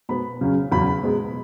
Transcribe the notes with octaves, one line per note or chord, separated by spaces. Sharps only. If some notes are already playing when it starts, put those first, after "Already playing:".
B2 B3 B5
C#3 F#3 C#4
E2 C#3 F#3 C#4 B5
B2 G#3 B3